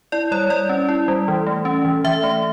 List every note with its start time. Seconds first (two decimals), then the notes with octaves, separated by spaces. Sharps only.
0.12 E4 D5
0.31 G3 C#5
0.50 G3 D5
0.69 C#4
0.89 E4
1.08 G3
1.28 E3
1.47 A3
1.65 C#4
1.85 E3
2.04 E3 E5
2.24 A3